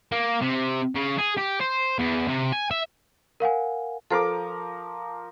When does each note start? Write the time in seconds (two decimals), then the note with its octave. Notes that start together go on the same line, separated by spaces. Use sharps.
0.12 A#3
0.41 C3
0.95 C#3
1.18 G#4
1.37 G4
1.60 C5
1.98 E2
2.28 C3
2.53 G#5
2.71 E5
3.40 A#4 F5 F#5 G#5
4.10 F3 A4 A#4 C5 D6